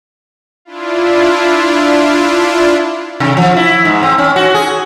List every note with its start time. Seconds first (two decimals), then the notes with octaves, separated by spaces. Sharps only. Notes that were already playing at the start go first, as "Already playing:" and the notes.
0.65 D4 E4 F4
3.20 C3
3.37 F3
3.56 E4
3.85 G#2
4.03 C4
4.18 C#4
4.36 F#4
4.54 G#4